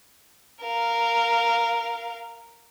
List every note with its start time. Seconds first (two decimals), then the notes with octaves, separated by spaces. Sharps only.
0.63 A#4 F5